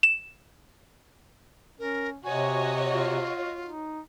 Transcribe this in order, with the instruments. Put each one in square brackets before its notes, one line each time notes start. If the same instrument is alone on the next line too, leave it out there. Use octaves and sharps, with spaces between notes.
[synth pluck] E7
[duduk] C#4 [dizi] A#4
[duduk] C3 [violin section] F#4 C#5 D#5 [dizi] G#5
[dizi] F4
[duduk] D#4